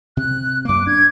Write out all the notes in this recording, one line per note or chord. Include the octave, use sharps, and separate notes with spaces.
C3 F#6
F#2 A#3 D6 F#6
D4 G#6